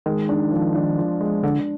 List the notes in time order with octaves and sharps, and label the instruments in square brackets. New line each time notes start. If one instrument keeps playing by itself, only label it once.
[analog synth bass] D#3 [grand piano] G#3
[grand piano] D4
F3
D4
F4
G#3
[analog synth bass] D3 [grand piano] D4